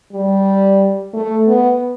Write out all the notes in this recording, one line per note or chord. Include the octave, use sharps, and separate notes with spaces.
G3
A3
B3